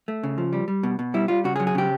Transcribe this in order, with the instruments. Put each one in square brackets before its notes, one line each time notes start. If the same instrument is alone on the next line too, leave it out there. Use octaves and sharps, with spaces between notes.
[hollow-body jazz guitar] A3
C#3
F3
G3
G3
B2
B2
G3 E4
G3 F4
C#3 F#4
G#4
F#3
G#4
C#3 G4